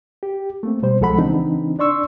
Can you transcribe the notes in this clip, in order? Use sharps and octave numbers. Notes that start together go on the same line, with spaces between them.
G4
A3 A#3 C4
B2 G3 C5
C2 F3 G#3 A4 F#5 B5
C#3 E3 C4 D4 D#4
D4 D5 C6 C#6 E6